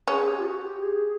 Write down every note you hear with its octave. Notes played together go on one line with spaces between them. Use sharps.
C#4 G#4
G4
F4
F#4
G4
G#4